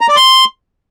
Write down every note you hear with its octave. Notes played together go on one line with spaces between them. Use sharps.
A#5
D5
C6